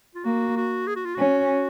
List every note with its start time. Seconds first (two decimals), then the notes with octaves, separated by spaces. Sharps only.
0.15 F4
0.25 A#3 F#4
0.57 F#4
0.87 G#4
0.96 F#4
1.05 F4
1.15 C#4 F#4